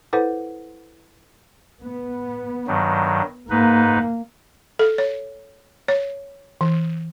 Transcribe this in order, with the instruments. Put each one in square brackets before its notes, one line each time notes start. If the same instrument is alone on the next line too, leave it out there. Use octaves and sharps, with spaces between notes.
[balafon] E4 A4 B4 C5 F#5
[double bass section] B3
[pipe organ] G2 D#3 F#3
[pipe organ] G#2 D#4 B4 [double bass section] A#3
[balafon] A4
C#5
C#5
E3